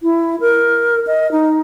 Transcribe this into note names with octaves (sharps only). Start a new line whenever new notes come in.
E4
A#4
D#5
D#4